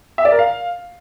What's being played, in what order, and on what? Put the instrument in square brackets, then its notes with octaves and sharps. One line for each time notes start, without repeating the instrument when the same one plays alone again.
[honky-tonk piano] E5
D5
A#4
F5